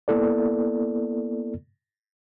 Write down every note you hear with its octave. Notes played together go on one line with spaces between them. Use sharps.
A#3 B3 E4 A4 D5